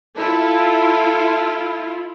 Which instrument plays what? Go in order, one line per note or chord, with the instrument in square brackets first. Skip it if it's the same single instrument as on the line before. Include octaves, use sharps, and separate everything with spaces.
[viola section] E4 F4 [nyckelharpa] A4